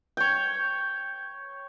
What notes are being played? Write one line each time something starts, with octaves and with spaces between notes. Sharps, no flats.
C#5 G5